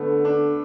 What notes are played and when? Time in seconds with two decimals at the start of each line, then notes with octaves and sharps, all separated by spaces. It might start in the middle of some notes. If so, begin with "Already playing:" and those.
Already playing: D3 A3 B3
0.25 D4